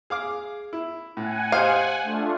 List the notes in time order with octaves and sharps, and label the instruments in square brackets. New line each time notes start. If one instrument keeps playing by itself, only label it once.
[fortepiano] G#4 F5 D6
E4
[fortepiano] A2 [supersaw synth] F#5 G#5
[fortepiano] G4 C5 D#5 [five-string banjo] F5
[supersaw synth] A3 D4 F4